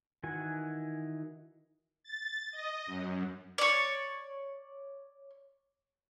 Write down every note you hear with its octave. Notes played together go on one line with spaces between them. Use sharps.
D#3 E3 F#4 G#5
A6
D#5
F#2
C#5 D5